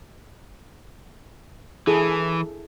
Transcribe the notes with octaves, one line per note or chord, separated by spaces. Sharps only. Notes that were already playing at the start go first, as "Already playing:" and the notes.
E3 E4 G#4 A4